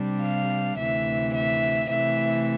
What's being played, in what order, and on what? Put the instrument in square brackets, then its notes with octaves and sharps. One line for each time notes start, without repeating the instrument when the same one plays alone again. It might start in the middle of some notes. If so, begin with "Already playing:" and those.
Already playing: [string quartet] C3 G3 D4
F5
D2 C3 E3 E5
E5
C3 E3 A3 E5